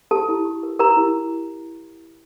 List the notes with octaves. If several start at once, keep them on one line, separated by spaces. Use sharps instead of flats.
G4 A4 A5
E4
G4
A#4
G4 A#4 A#5
E4